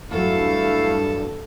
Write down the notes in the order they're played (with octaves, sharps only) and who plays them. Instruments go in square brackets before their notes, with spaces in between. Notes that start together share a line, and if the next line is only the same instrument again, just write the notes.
[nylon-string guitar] E2 F#3 [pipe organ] G2 [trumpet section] A3 E4 F5 [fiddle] A4